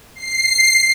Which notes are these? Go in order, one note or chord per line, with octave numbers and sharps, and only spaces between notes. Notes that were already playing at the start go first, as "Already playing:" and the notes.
C7